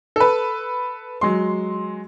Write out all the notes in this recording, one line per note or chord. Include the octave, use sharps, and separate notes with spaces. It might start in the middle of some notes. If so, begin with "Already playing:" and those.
A4 B4
F#3 G#3 C6